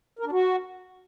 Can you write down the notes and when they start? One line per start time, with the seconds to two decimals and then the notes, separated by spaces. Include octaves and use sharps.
0.19 A#4
0.26 D4
0.32 F#4